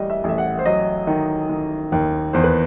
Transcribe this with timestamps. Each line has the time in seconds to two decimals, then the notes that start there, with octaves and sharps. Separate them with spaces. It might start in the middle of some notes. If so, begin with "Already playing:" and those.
Already playing: A1 G3 D#5
0.10 E5
0.24 A1 E5
0.38 F#5
0.59 C5
0.65 F#3 D#5
1.07 D#3
1.49 D#3
1.92 D#2
2.33 E2 C5
2.44 B4